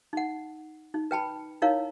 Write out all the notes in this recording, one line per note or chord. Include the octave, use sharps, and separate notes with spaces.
D#4 F#5
D#4
B4 G5 A5 B5
D#4 E4 A#4 C#5 F5